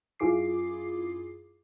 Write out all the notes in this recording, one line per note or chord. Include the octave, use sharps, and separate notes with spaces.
F#2 E4 F4 G#4 D6 C7